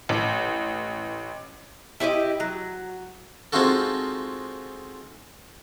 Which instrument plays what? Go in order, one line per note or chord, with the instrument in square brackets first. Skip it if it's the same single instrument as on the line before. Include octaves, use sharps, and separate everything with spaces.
[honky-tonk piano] A1
[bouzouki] E4 G4 C#5 D#5
F#3
[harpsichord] G#3 C4 D#4 F4 F#4 A4